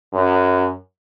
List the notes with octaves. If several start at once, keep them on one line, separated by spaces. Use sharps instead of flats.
F#2